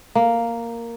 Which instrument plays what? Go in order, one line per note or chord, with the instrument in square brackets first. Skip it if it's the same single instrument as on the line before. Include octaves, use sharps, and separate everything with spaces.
[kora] A#3